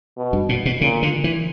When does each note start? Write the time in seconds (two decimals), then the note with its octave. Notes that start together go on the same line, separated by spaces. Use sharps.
0.17 B2
0.33 G2
0.49 A#2
0.66 B2
0.81 A#2 C#3
1.03 D3
1.24 E3